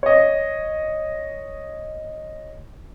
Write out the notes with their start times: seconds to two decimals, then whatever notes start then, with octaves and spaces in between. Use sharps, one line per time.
0.03 C#5 D#5